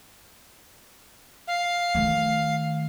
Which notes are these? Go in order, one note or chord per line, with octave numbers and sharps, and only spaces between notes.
F5
D#3 A3